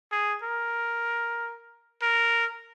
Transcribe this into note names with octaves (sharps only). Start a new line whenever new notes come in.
G#4
A#4
A#4